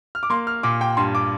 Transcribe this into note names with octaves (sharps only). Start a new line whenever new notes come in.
F6
D6
A#3 C6
F6
A#2 D6
G5
G2 C6
D6